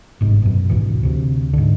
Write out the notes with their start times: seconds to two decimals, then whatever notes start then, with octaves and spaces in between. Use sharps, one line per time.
0.21 G1 G#2 C3
0.42 F#2 B2
0.69 G#1 D2 B2 E3
1.03 D2 C3
1.53 G#2 D3